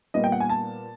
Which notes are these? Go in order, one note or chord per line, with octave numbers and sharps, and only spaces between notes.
A#2 G3 B3 D#5
G5
F#5
G#5
A5